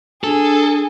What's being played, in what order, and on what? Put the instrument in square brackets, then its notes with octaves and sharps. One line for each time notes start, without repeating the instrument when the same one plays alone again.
[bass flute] D4 [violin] G#4 [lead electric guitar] A4